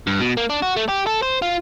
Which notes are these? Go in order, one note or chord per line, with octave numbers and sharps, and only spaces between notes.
G2
B2
A#3
D4
F#4
A3
G4
A4
C5
F4